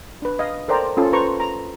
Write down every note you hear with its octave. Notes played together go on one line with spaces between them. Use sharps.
D4 B4
D#5 F5
A4 A#4 C5 D5 G5 A#5
C#4 F4 A4
B4 C5 A#5 C#6
A#5